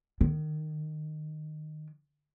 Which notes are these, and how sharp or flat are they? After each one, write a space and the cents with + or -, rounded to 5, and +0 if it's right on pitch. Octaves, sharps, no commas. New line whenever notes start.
D#3 -20